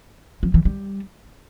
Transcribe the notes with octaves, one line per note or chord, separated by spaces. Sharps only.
F3
E3
G3